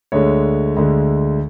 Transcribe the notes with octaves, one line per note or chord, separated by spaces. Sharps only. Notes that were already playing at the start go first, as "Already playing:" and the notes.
D2 D3 G#3 C#5
D2 D3 G#3